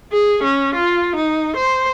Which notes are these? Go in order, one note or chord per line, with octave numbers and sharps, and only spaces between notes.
G#4
C#4
F4
D#4
C5